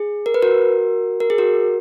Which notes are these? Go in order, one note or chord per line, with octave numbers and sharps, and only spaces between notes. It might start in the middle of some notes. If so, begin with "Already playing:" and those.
Already playing: G#4
A#4
B4
F#4 A#4
A#4
G#4
F#4 A#4